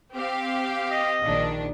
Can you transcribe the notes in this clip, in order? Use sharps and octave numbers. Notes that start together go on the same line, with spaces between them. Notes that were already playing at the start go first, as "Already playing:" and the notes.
C4 G4 F5
D#5
A#1 D#3 D4